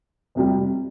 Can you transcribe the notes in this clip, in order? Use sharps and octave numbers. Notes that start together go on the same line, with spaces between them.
F2 C3 G3